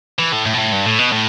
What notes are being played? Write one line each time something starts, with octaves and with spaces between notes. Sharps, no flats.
E3
A2
A2
B2
A2
G2
A2
B2
A2